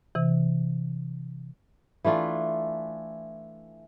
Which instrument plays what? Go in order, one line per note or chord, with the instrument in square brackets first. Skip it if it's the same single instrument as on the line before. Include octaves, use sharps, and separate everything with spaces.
[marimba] C3 E3
[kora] E3 A3 D4 F4